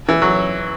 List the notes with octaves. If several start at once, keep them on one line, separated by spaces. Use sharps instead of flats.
E3
F#3